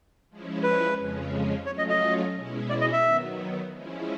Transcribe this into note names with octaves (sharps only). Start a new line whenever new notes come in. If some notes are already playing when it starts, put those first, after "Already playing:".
F3 G#3 C#4 E4
B4
F2 C#3 F3 G#3 C#4
F#3 A3 C#4 F4 C#5
D#5
D#5
B2 G#3 C#4 E4
D5
D#5
E5
D#3 F#3 B3
F3 G#3 C#4 E4